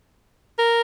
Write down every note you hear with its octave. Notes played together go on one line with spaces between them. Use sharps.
A#4